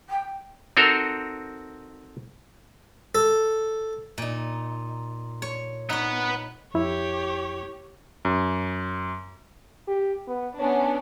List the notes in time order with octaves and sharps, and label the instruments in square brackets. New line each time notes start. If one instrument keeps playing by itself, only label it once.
[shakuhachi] G5
[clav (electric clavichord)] C4 D#4 F#4 A4 A#4 C5
[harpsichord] A4
[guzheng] A#2 D#4
C#5
[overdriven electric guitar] B3 B4 [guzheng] D#4 C#5
[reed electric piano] F2 E4 [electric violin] G4 C#5
[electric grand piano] F#2
[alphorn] G4
B3
[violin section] B3 C#4 D4 [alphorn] C#5